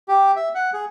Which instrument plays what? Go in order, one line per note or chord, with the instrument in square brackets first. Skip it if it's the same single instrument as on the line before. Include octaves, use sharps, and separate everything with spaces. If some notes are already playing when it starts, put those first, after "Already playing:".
[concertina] G4
E5
F#5
G#4